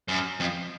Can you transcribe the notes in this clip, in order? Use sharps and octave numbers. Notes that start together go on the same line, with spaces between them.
F#2
F2